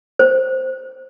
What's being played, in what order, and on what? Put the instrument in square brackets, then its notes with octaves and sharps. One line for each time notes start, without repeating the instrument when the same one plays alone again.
[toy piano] C5